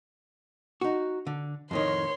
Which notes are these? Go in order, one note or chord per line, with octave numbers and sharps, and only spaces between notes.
D#4 F#4
D3
F2 A2 D#3 C#5 C6